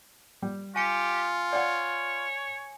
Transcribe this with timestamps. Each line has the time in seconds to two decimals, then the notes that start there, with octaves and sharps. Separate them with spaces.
0.42 G3
0.76 F4 G4 G#5 C#7
1.53 C#5 D5 F5 F#5